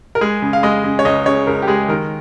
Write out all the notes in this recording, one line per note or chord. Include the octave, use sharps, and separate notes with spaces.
A#4
G#3 G#4
C#3
F5
G#3 D#5
C#3
C#5
C#2 D#5
C#3 C#5
C#2 A#4
G4
G#3 G#4
D#3 A#4